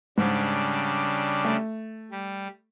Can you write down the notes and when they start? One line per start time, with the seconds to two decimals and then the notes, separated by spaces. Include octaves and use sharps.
0.18 G#2 C#3 G3 D4
1.45 A3
2.11 G3